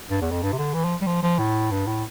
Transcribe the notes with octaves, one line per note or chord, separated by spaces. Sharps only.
G2
E2
F2
G2
C3
D3
E3
F3
G3
F3
F3
A2
G2
A2